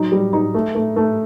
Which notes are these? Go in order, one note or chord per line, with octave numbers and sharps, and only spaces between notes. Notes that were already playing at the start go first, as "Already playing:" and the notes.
Already playing: F#3 D#4
G3
D#4
A3
A3
A3